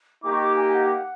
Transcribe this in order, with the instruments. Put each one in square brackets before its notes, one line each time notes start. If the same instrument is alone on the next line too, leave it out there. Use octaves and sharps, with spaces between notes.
[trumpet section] A#3 D#4 G4 [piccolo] D6
[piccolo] C#6
D6
G#5
F#5